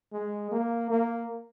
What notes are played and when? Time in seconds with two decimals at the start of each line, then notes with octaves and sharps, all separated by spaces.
0.13 G#3
0.52 A#3
0.90 A#3